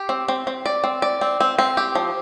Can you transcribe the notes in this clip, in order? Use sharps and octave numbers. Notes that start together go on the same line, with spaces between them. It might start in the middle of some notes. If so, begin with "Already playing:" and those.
Already playing: G4
C4
C4
C4
D5
C4
D5
C4
C4
C4
G4
F3